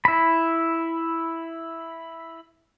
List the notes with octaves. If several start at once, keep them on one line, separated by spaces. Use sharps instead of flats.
E4 B5